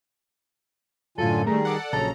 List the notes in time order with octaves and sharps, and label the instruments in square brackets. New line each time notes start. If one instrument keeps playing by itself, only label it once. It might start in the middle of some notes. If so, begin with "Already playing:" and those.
[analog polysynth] F#2 A2 [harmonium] D3 F4 G#5 [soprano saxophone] A4
[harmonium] D#3 G3 G#4 [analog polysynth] A3 [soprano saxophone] A#4
[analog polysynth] A4 D5 F#5
[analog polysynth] A#1 C#3 A#5 [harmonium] F#3 [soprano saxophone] A4